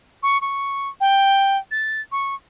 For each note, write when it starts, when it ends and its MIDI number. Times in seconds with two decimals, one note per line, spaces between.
0.23 0.40 85
0.41 0.88 85
1.01 1.58 79
1.71 2.01 93
2.12 2.35 85